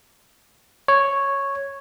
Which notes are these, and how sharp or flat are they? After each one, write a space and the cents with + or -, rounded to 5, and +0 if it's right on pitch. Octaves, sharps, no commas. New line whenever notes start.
C#5 -5